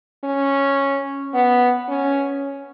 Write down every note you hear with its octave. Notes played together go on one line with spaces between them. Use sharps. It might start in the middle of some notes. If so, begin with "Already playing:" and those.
C#4
B3
C#4